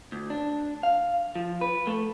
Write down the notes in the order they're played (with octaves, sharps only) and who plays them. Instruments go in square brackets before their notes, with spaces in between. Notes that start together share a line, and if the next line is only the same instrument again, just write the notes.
[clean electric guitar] D2
D4
F5
F3
B4
A3